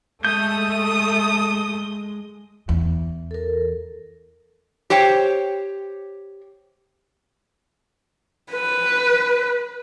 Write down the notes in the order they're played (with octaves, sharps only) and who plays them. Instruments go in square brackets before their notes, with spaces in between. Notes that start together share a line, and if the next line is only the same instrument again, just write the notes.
[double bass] G#3 [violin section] A3 [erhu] D#6 [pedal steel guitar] G6
[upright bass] E2
[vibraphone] A4 A#4
[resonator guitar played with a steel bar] G4 C5 C#5 G5
[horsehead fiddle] B4